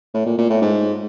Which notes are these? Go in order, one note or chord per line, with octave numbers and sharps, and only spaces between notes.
A2
A#2
A#2
A2
G#2